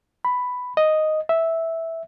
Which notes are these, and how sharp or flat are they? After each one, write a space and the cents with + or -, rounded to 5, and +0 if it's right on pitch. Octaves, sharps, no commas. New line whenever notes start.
B5 +5
D#5 +0
E5 -5